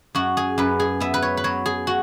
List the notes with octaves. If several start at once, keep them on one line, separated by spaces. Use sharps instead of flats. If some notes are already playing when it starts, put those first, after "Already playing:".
F#2 F#4
G#4
F#2 B4
G#4
B3 E5
B4
C#5
B4
F#3 C#5
G#4
F#4